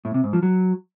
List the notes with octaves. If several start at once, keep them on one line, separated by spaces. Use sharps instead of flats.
A2
C3
G#2
F3
F#3